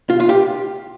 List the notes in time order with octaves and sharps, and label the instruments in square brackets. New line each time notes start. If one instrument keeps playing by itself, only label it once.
[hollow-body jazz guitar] F4
F4
G4